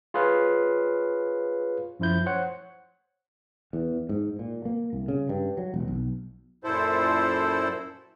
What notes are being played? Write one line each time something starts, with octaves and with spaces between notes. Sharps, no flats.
F4 G#4 B4 C#5 F5
F#2 F3 E4 G6
C5 C#5 F#5
E2
G#2
A#2
A#3
C2
C#3
G2
F#3
E1
B1
F#2 A#2 E4 A4 C5